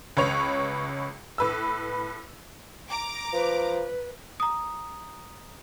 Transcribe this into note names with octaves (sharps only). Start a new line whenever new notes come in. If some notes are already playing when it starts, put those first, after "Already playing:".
C#2 B4 C#5 F7
A2 B4 E6
A#5 D6
F3 B4
A#5 D#6